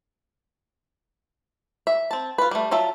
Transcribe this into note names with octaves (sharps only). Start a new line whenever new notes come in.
E5
C4 A5
F4 B4
G3 A3
F#3 F4 A4 E5